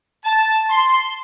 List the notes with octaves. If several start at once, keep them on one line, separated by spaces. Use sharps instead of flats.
A5
C6